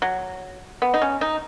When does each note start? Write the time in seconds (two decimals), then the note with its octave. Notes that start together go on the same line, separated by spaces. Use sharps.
0.02 F#3
0.82 B3
0.94 D#4
1.02 C#4
1.21 D#4